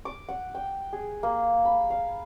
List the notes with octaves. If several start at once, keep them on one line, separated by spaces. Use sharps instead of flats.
D6
F#5
G5
G#4
A#3
B5
F5